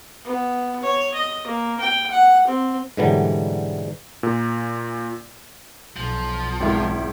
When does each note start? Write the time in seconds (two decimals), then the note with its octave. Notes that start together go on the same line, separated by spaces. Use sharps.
0.24 B3
0.82 C#5
1.14 D#5
1.47 A#3
1.81 G5
2.12 F#5
2.47 C4
2.97 G#2 B2 D3 E3 F#3 G3
4.23 A#2
5.96 B1 F3
6.60 G#1 C#2 E4